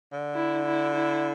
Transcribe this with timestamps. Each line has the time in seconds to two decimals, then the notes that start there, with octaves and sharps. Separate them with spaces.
0.13 D3
0.34 E4
0.65 E4
0.95 E4